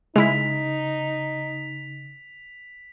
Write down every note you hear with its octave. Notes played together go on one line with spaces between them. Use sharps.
C#3 G#3 D#4 E4 B6 F7